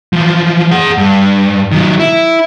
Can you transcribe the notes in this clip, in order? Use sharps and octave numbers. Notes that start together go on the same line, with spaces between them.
E3 F3
G#4 F#5
G2
D#3 F#3
E4